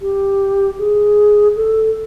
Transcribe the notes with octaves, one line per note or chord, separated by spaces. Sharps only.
G4
G#4
A4